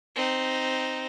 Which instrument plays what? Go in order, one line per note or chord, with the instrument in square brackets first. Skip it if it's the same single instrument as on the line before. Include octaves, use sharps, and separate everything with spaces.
[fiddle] C4 D#4